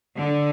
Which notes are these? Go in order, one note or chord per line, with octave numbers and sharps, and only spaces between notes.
D3